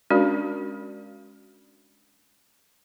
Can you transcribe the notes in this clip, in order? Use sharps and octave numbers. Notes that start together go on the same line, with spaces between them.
G#3 C#4 D4 F#4 A#4 D5